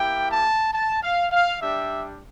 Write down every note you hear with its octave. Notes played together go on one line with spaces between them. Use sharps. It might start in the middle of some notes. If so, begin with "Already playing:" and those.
Already playing: A#3 E4 G4 G5
A5
A5
F5
F5
G3 D4 G4 E5